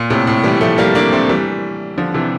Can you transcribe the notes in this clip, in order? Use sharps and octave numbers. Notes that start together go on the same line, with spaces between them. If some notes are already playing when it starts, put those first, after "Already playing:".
Already playing: A#2
A2 C3
A2
E3 G3
F3 A3
G3 A#3
A#3 D4
A3 C4
E3 G3
D3 F3
C3 E3